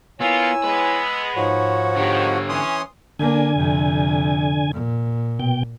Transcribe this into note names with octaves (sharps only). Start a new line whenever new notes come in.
A#3 B3 E4 F4 C#5 G#5 E6
G#3 B3 B4
G#2 F3 F#4 C#5
D3 D#3 G4
E3 C#4 C6 D#6
D3 A#3 D4 G#5
F2 C3
A#2
B2 G5